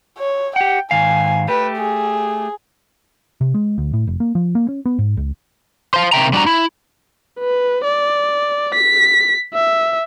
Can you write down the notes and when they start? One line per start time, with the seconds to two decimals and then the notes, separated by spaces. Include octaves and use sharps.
0.17 C#5
0.56 G4 F#5 G5
0.91 G#2 D#3 F5 G#5
1.48 A3 G4 B4
1.77 G#4
3.41 C3
3.54 G#3
3.78 D2
3.93 A2
4.07 F1
4.20 A#3
4.35 F3
4.55 A#3
4.69 C#4
4.85 B3
4.99 G#2
5.17 C#2
5.94 C5 F5
6.13 C3 D#3 A#3 E5 G5 A#5
6.33 G3 D4 F#4 A#5
6.47 E4
7.40 B4
7.84 D5
8.74 B6
9.54 E5